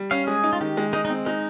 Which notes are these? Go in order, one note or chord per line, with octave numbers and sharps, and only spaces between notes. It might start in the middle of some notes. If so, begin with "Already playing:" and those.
Already playing: G3
C#4 F5
G#3 G#4
D#4
F4
D#3 G4
G#3
G#3 D#4
D#4
C4
G#3 D#4